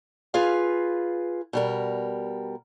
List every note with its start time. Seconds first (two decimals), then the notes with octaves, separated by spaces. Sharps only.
0.34 F4 G#4 B4 F5
1.53 B2 G3 A#4